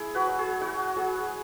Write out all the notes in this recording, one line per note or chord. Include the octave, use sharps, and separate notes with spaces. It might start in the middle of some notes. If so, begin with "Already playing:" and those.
Already playing: E4 G#4
F#4 B4
F#3
G#4
E4 F#4
F#3 G#4